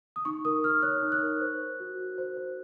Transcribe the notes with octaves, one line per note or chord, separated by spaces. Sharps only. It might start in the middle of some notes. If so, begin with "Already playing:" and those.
D#6
D#4 C#6
A#4 D#6
D#4 F6
C#5 F#6
D#4
F#6
A#4
C5
C5
F#4
F#4
C5
C5